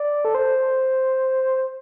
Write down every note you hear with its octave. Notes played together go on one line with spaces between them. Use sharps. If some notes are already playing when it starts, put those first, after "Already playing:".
Already playing: D5
A4
C5